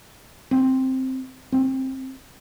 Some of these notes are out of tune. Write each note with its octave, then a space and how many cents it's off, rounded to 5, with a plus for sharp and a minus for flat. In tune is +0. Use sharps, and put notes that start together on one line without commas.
C4 +0
C4 +15